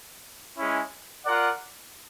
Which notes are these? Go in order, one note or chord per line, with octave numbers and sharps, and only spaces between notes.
G#3 C#4 E4
F4 A#4 D5 F#5